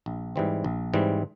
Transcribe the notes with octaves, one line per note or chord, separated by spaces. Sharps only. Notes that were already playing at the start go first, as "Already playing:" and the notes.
A#1
G#2 E3 G3 C4
A#1
G#2 E3 G3 C4